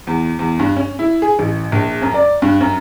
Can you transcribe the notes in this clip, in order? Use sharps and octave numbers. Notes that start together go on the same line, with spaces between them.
E2
E2
G2
C#4
E4
G#4
A1
A#1
F#2
D5
G2
F#2